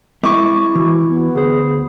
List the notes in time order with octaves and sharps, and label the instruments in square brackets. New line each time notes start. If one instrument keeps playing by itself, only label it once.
[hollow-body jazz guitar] G#3 C4 E5 [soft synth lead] E4 [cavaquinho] C#6 D6
[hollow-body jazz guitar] E3 [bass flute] F#4
[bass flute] B3
[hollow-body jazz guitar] D2 C5 [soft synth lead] G#4